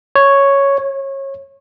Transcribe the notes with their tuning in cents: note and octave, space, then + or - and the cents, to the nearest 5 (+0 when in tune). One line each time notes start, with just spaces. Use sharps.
C#5 +0
C#5 -25